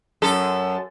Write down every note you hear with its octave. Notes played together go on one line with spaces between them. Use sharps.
F#2 A4